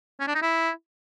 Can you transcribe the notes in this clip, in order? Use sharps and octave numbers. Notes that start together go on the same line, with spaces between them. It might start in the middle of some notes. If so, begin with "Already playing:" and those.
C#4
D4
D#4
E4